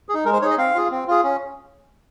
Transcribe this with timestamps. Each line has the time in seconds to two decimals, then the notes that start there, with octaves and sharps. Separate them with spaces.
0.09 G#4
0.14 D#4
0.25 G#3 A#4
0.33 C5
0.42 D#4 G#4 C#5
0.51 D#5
0.58 C4 F5
0.75 F4 G#4
0.91 C4
1.08 F4 G#4
1.23 C#4